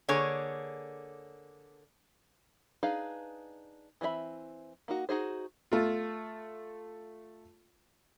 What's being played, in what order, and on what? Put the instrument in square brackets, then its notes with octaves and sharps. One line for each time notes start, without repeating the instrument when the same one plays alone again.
[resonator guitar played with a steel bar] D3 A#3 G#4 C#5
[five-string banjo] D4 D#4 G#4 B4 F5
E3 C4 D4 E5 B5
A#3 D#4 F#4
D#4 F#4 G#4 C5
[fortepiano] A3 F4